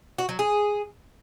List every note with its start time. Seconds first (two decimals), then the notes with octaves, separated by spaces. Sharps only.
0.18 F#4
0.29 F#3
0.39 G#4